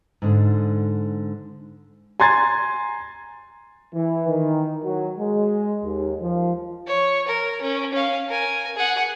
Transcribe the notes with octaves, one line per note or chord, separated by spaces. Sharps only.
G#2 D3
G#5 A#5 C6 G#6 A6
E3
D#3
F#3
G#3
D#2
F3
C#5
A#4
C#4
C#4 F5
A#4 G#5
G#4 F#5